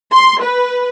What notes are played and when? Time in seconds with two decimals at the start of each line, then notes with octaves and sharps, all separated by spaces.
0.12 C6
0.41 B4